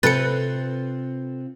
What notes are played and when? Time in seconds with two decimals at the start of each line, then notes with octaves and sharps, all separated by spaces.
0.03 C3 C4 F4 A4 B4 A6 C#7